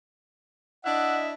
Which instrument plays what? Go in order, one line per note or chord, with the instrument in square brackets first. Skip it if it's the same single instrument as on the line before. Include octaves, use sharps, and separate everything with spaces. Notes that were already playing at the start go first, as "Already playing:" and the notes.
[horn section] D4 E4 E5 [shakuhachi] D#5 [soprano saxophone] F#5